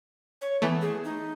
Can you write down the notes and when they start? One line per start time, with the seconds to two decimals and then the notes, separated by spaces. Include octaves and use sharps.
0.42 C#5
0.62 E3 A3 B3
0.81 G#4
1.04 D#4